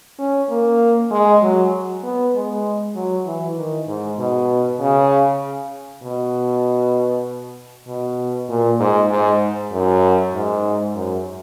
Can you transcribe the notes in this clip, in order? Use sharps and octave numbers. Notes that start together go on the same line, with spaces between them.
C#4
A#3
G#3
F#3
B3
G#3
F#3
E3
D#3
G#2
B2
C#3
B2
B2
A#2
G#2
G#2
F#2
G#2
F#2